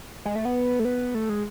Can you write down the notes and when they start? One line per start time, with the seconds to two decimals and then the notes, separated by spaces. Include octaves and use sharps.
0.25 G#3
0.36 A3
0.45 B3
0.80 A3
0.85 B3
1.15 A3
1.29 G#3